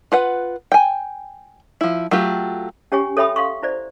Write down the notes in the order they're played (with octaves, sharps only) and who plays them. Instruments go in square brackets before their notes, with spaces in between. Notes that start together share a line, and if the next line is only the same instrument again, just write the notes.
[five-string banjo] F4 B4 F#5
G5 G#5
F3 E4
F#3 A3 F4 G4
[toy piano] C#4 G4 C#5 G#5 C#6
A4 C#5 E5 G5 B5 D#6
F5 C6 C#6
E4 C5 D5